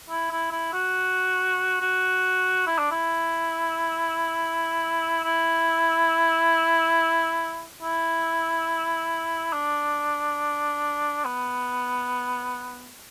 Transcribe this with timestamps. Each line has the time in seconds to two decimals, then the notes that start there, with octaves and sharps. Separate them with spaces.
0.10 E4
0.31 E4
0.52 E4
0.73 F#4
1.81 F#4
2.67 E4
2.78 D4
2.91 E4
5.24 E4
7.82 E4
9.53 D4
11.25 B3